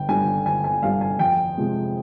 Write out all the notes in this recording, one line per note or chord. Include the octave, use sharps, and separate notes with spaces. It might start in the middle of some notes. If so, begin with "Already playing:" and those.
Already playing: G1 G5
G2 D3 G3 G#5
G1 G#5
G#5
G2 D3 G3 F5
G#5
F2 G5
C3 F3 G#3